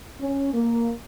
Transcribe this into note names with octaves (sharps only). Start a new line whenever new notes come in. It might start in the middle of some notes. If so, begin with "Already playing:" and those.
C#4
A#3